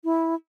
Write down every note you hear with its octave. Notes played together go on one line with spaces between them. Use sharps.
E4